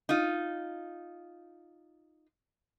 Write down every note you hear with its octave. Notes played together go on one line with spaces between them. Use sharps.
D#4 F4